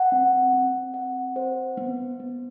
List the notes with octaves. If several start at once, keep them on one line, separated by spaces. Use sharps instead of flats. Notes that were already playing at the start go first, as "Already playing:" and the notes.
Already playing: F#5
C4
C4
F#5
C5
B3
B3